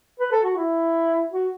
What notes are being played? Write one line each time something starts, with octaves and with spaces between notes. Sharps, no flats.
B4
A4
F#4
E4
F#4